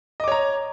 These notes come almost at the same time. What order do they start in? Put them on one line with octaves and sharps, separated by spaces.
D#5 D6 C#5 A#5